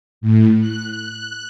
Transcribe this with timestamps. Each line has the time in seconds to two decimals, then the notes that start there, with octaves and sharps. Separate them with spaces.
0.21 A2
0.60 F#6
0.91 F#6